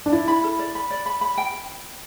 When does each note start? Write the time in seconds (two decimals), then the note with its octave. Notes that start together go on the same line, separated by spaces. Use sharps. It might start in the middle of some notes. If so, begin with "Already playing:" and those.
0.06 D4
0.12 E4 D5
0.28 B5
0.44 A4
0.59 D5
0.75 B5
0.91 D5
1.06 B5
1.21 B5
1.38 G5